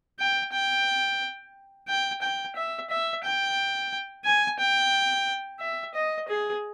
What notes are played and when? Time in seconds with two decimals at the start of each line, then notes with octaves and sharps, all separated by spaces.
0.19 G5
0.52 G5
1.88 G5
2.21 G5
2.56 E5
2.90 E5
3.24 G5
4.25 G#5
4.59 G5
5.60 E5
5.94 D#5
6.28 G#4